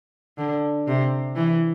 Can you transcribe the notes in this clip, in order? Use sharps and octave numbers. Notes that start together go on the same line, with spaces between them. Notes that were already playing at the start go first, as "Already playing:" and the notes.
D3
C3
E3